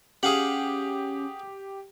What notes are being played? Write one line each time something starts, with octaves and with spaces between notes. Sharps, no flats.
C#4 G4 G#4 F5 F#5